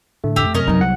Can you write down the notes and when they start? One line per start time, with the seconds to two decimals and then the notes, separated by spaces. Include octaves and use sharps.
0.24 A2 D3 A3
0.36 F2 G4 E6
0.54 F#2 C3 C#4 A#4 D#5
0.68 F#3 B3 D#4
0.80 C2 F#5